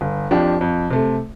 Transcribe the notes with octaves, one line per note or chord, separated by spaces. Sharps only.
G1
F2 F3 D4 G4
F2
C3 A3